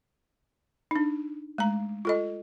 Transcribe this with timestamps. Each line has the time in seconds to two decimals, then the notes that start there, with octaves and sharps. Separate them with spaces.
0.91 D4 D#4
1.58 G#3 A3 A#5
2.05 F4 A4 D#5